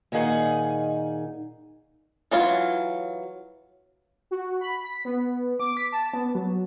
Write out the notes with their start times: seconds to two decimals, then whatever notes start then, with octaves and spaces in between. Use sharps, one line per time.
0.12 A#2 D#3 D#4 G#4 F#5
2.31 E3 F#3 F4
4.31 F#4
4.61 B5
4.84 B6
5.05 B3
5.60 D6
5.77 B6
5.92 A5
6.14 B3
6.35 F#3